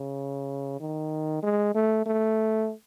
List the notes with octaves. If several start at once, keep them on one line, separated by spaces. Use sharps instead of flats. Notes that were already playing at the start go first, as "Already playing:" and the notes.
Already playing: C#3
D#3
G#3
A3
A3